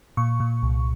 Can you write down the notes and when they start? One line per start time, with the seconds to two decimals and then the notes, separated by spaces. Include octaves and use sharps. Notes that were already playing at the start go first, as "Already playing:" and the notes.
0.17 A#2 C#6
0.40 A#2
0.63 C2